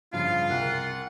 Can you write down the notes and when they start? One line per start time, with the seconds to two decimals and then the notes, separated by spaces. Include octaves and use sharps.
0.13 G2 C#3 F3 F4 F5
0.49 C2 A#4 F#5